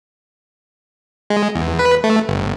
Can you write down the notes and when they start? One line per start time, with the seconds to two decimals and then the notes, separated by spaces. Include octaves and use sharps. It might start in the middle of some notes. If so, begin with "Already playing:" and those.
1.30 G#3
1.55 E2
1.79 B4
2.04 A3
2.29 G1